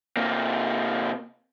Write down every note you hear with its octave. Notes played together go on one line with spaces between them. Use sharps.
C3 A#3